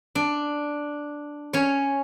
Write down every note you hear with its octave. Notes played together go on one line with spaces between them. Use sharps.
D4
C#4 C#5